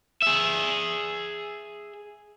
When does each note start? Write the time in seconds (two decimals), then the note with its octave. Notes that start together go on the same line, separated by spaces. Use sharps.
0.22 G#4 E5